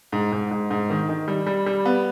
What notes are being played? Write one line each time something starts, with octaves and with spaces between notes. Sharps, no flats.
G#2
G#2
G#2
G#2
D#3
D#3
G3
G3
G3
B3